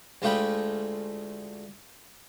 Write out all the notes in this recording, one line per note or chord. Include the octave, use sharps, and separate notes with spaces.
D2 G#3 A3 F4 G5 B5